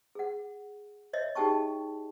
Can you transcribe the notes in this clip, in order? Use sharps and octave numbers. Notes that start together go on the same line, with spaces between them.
G#4 F#5
C#5 D#5 E5
D#4 G4 G#4 G5 A5 C#6